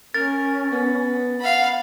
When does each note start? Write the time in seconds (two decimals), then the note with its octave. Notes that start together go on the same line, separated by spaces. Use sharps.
0.14 C#4 A#4 A6
0.71 B3
1.41 F5 F#5 B5